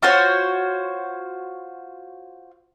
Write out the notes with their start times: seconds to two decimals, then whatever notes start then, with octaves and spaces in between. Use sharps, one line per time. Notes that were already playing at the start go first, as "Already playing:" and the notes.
0.02 F4 F#4 C5 C#5